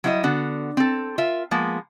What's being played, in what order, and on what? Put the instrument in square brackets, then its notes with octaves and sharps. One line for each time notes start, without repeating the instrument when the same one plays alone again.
[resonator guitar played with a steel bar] F#3 G3 E4 C#5 D#5
D3 B3 F#4
C4 A4
F4 A#4 E5
F3 G#3 A#3 B3